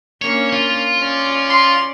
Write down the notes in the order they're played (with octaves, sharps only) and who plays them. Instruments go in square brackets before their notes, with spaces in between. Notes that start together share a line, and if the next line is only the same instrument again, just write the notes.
[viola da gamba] A#3 C#4 D4 [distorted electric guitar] C#5
[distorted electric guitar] F4
[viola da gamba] C#4 D5
[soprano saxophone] C6